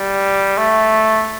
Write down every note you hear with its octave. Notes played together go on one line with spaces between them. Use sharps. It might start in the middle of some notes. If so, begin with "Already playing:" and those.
Already playing: G3
A3